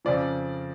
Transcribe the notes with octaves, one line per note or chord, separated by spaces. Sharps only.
F2 C#3 F3 D5